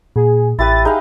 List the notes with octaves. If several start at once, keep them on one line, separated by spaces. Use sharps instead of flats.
A#2 G#4
A1 E4 G4 B4 A6
D#4 G#4 F5